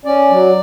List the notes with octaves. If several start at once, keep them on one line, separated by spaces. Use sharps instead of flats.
C#4 D5
F#3